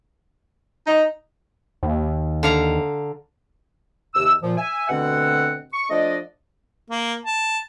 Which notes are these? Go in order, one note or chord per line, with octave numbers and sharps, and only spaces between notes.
D#4
D#2
D3 F5 A#5
D#2 C3 E6
A#2 F3
E5 G#5
D2 B2 D3 C4 F#5
C#6
F3 A3 D4 D5 D#5
A#3
A5